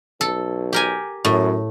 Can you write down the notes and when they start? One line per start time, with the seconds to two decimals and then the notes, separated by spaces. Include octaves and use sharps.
0.21 B1 A4
0.73 G4 A#4 G#5
1.25 F#2 A2